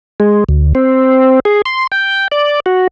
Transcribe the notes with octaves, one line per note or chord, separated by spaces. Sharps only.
G#3
D2
C4
G#4
C6
G5
D5
F#4